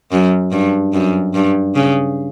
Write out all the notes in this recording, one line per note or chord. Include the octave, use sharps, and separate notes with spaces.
F#2
G2
F#2
G2
C#3